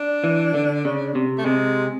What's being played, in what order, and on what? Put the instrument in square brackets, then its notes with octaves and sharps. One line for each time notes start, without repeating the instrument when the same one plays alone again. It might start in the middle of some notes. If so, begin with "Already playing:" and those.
Already playing: [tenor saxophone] D4
[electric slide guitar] E3
D3
C#3
C3
[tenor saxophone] A3
[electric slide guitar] C3 [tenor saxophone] G#3